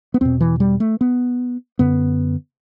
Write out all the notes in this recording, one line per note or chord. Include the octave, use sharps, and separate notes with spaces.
B3
E2 B2 C4
E3
G3
A3
B3
F#2 D3 B3